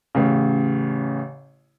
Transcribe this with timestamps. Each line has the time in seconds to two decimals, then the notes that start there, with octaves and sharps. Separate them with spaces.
0.15 A1 C#3